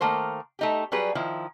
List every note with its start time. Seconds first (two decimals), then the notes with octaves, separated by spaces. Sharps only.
0.01 D#3 A3 A#3 C5
0.59 A3 D#4 G4
0.92 F#3 G3 G#4 B4
1.15 D#3 F3 E4